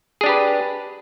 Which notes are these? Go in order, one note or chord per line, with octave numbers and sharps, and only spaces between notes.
D4 G4 G#4 B4